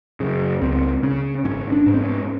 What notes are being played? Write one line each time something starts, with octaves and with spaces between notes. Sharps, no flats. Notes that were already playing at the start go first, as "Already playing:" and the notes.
F#2 C#3
C#2 C4
C#3 C#4
G#1 C#4
D4
G#2
C4
C#4